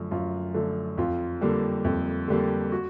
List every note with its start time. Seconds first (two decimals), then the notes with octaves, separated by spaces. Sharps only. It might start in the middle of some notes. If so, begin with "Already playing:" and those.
Already playing: F#2 D3 F3 A3
0.11 F#2 F4
0.54 D3 F3 A3
0.98 F2 F4
1.41 D3 G3 A#3
1.85 F2
2.28 D3 G3 A#3
2.72 F#4